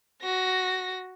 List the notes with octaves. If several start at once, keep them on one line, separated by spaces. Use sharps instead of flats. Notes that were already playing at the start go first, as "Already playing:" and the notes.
F#4 A#6